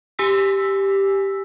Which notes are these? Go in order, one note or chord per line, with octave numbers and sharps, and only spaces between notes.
G4 G#5 E6 B6